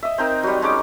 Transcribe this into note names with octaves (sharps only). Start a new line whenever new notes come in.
D#5 E5
C4 D#4 A#4
F#3 G3
G#3 C#4 D#4 D6